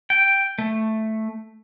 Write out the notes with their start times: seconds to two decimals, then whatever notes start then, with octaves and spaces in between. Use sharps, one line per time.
0.10 G5
0.59 A3